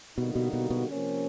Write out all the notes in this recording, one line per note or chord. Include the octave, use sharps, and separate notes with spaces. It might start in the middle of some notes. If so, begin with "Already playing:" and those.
B2 D3 G3 A#3 D#4 F#4
B2
B2
B2
C3 F3 A#3 C#4